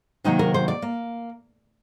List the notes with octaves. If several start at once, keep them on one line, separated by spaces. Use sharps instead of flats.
C3 D#3 F#3 A#3 D#4
A#4
C5
D5
A#3